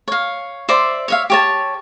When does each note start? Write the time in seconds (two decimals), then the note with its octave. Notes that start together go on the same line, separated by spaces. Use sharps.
0.08 C#5 F5
0.69 C5 D5 E5 C6
1.08 C#5 E5 F5
1.30 G4 C#5 A5